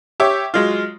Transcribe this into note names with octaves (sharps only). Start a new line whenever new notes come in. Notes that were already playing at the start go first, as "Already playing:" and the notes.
G4 C#5 E5 D6
F#3 G#3 F4